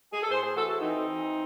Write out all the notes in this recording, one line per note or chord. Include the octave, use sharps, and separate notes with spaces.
G#4
A4
A2 G#4 C5
G#4 C5
E3 F#4 A4
F#4 A4
E3 C4 D#4
E3